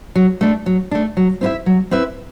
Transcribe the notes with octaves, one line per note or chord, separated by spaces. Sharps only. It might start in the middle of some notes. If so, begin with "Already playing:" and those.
F#3
A3 D4
F#3
A3 D4
F#3
C4 E4 B4 E5
F#3
C4 E4 B4 E5